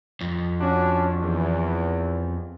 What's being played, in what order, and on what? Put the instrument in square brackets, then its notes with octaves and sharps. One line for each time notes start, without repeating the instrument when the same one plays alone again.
[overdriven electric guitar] F2
[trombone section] C#4 D4 F#4
E2